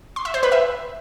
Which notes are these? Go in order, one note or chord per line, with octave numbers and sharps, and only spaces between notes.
C6
E5
C5
B4
E5